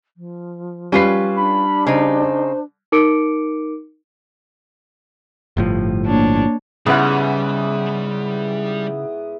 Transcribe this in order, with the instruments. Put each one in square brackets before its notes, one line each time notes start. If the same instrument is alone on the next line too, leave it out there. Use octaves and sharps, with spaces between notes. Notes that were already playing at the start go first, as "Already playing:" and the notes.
[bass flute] F3
[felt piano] G3 C7 [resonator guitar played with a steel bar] C#4 F4 B4
[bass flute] D4 [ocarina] B5
[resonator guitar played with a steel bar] C#3 D#4 [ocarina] C5
[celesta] D#4 A#4 D6 C#7 D7
[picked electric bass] G1 A2 F3
[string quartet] A#3 D4 C#5
[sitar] G#2 [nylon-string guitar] C#3 F#5 [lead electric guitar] G3 [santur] B3 E4 B4